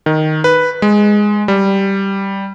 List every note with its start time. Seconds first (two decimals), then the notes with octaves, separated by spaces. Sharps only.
0.06 D#3
0.44 B4
0.82 G#3
1.48 G3